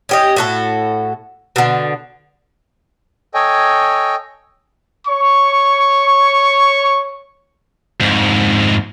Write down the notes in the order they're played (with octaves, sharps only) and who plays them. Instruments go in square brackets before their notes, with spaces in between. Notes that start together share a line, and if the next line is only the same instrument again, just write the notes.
[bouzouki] C#4 G4 D#5
A2 F#4 A4
B2 D3
[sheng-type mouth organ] A4 C#5 D#5 G5 G#5
[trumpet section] C#5 C#6
[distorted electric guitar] F2 G#2